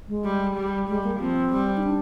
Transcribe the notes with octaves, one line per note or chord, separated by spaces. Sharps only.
G#3
G3
G3
G3 G#3
A#3
F3 C4
G3
D#4
D4